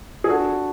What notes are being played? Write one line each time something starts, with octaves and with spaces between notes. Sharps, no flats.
G#4
D4 F#4 A4